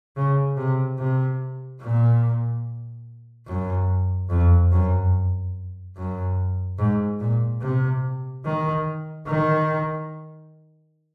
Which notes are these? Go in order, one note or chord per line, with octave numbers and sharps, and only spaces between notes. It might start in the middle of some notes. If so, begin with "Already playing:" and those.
C#3
C3
C3
A#2
F#2
F2
F#2
F#2
G#2
A#2
C3
D#3
D#3